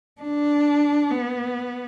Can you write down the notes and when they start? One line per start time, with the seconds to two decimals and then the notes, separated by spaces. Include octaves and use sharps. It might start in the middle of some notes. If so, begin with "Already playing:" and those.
0.22 D4
1.11 B3